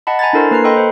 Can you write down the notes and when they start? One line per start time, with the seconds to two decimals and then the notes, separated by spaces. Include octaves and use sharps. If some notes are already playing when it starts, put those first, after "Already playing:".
0.07 D#5 F#5 A5 B5
0.19 G#5 A#5 B5 G#6 A6
0.33 D4 E4 A4 A#4 C5 C6
0.51 A#3 B4 A#5 C7
0.64 A4 D#5 G5 B5 C6
0.77 C5